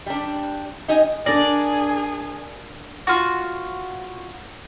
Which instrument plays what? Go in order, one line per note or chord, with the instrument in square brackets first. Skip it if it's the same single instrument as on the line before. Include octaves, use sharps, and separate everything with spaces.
[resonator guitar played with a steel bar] G3 D4
D#4 G4 D#5 G#5
[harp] D4 A#4 A#6 [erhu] G#4 [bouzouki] D5
[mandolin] F4 F#4